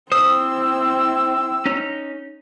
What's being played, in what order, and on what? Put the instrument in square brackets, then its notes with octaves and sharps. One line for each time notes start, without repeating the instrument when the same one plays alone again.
[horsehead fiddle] C4 E4 [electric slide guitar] C5 [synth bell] D#6 [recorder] E6
[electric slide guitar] C#4 D#4 C#5